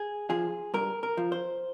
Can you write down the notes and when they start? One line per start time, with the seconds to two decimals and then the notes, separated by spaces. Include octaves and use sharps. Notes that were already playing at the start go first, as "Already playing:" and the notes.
Already playing: G#4
0.30 F3 G#4
0.74 G2 A#4
1.03 A#4
1.17 F3
1.32 C5